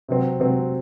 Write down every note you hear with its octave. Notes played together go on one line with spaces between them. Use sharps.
C3 F#3 C4
C3 F#3 C4